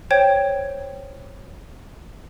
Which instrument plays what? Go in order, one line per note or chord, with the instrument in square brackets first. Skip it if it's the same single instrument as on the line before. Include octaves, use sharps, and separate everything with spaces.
[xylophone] C5 C#5 G5 G#6